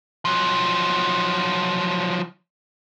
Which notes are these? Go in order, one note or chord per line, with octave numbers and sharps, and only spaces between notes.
F3 F#3